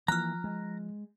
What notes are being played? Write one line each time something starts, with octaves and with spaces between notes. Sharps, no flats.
E3 F3 A#3 A#5 F6 F#6
G#3